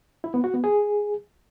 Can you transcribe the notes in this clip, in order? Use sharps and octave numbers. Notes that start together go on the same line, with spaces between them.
E4
B3
F#4
B3
G#4